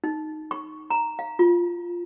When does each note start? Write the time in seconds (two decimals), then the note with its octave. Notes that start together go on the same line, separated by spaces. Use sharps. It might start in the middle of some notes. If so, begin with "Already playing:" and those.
0.04 D#4
0.51 C#6
0.90 A#5
1.19 F5
1.39 F4